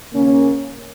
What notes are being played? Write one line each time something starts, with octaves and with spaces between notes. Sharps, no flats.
D#2 C#3 A#3 C#4